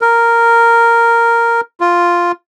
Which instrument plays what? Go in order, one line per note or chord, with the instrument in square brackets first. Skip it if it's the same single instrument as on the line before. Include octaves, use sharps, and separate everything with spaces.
[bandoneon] A#4
F4